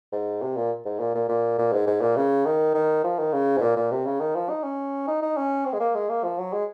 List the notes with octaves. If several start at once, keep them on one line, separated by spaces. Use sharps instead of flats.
G#2
C3
A#2
G#2
A#2
A#2
A#2
A#2
G#2
G#2
A#2
C#3
D#3
D#3
F3
D#3
C#3
G#2
A#2
A#2
C3
C#3
D#3
F3
D#4
C#4
D#4
D#4
C#4
C4
G#3
A#3
G#3
A#3
F3
F#3
G#3